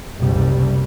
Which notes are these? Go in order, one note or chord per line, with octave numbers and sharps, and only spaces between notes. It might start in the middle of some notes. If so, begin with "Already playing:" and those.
F#1 C2 G3